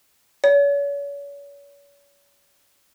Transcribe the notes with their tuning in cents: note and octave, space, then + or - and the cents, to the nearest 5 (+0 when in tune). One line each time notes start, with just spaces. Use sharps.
C#5 +40